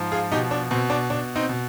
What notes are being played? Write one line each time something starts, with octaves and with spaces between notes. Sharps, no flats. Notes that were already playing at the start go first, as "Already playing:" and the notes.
Already playing: G#2 F3
F4 G#4
B2 D#4 G4
D4
B2 C4
D4
B2 D4
C4 D#4
B2